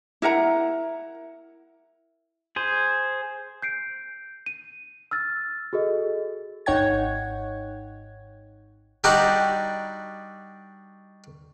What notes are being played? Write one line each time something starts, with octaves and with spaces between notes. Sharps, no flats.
E4 A#4 F#5 A#5
G#4 C5
G6 C7 D7
D#7
E6 F6 A6
F#4 G#4 A4 D#5
G#1 D#4 C#5 F#5 G5 G#6
G3 D4 D#4 F#4 G4